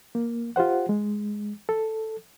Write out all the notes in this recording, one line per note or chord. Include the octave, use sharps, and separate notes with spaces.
A#3
F4 G4 C5 F#5
G#3
A4